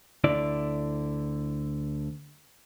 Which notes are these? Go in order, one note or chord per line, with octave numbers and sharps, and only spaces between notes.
D2 D3 E4 D5